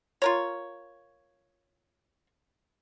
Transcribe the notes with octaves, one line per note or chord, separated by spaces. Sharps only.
F4 A#4 C#5